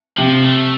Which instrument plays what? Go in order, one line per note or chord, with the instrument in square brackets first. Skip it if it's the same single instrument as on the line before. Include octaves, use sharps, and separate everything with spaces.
[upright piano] C3 [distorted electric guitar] F3
[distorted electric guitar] A3